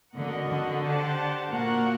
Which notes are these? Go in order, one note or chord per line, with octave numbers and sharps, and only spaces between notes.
D3 F#4 A#4 D#5 F#5
D3
D4 G4 C5 F#5 A5
A#2 A#3 F#4 A#4 F#5